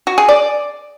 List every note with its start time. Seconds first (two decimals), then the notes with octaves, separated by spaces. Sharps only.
0.07 F#4
0.18 G#4
0.29 D5